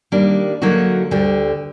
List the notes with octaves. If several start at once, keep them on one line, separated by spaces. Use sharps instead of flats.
D#3 G3 A#3 D4
D3 F#3 A#3 D#4 F#4
D2 D3 G3